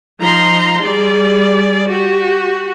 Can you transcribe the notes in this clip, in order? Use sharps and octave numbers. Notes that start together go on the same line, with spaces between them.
F3 D#4 A#5 C6
G3 G#4 D5
F#4 G4